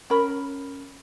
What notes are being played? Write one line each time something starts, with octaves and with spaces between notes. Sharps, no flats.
C#4 A#4 B5